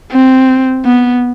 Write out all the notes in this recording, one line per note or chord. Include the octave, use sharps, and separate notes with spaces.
C4
B3